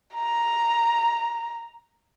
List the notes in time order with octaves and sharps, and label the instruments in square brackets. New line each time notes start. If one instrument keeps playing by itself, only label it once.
[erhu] A#5